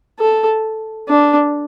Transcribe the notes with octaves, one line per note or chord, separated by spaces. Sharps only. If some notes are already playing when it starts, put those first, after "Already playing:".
A4
D4